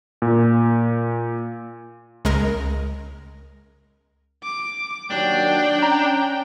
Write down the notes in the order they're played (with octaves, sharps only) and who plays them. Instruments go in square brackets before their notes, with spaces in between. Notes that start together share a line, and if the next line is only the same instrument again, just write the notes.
[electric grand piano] A#2
[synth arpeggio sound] C#2 G#3 A#4
[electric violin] D6
[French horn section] D#2 D#3 F#3 [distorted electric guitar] D4 [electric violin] G5
[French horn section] C#4 [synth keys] A#5